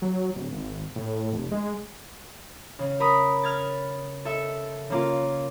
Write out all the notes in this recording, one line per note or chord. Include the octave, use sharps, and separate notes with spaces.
F#3
D1
G#1
A2
F1
G#3
C#3
A#4 B5 D#6
F6 G#6 A6
A4 E5
C#3 A#3 F4